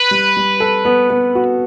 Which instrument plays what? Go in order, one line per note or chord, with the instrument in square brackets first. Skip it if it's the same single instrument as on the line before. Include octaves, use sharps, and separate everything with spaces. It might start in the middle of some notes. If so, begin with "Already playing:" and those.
Already playing: [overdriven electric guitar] B4
[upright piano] G3
G3
A4
B3
B3
F#4